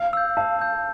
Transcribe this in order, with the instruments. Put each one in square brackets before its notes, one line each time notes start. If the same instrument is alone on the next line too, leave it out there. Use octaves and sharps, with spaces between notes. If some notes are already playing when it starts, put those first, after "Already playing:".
Already playing: [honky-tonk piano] F5
[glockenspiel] E6 G6
[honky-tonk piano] F5 [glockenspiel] A5
[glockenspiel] E6 G6